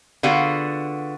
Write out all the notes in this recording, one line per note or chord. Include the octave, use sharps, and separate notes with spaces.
D3 B3 F4 F#4 G#4 F5